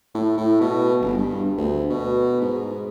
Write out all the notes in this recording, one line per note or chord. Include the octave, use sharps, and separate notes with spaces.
A2
A2
B2
G1
G2
D2
B2
G#2